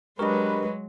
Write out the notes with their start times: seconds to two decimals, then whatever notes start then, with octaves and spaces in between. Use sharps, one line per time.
0.19 F#3 G#3 D4 G4 A#4 B4 D#5 C#6